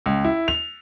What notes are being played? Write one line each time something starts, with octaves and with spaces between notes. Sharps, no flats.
C#2
E4
F7